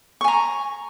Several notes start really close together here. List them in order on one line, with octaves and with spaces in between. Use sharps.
C#6 G#5 A#5